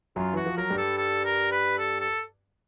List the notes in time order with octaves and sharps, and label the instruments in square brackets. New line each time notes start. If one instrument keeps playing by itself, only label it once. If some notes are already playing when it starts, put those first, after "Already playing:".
[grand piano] F#2 F#3 [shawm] F4
[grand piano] E3 [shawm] F#4
[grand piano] F3
[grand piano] F#3 [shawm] A#4
[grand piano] G2 G3
[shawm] A4
A4
A#4
B4
A4
A4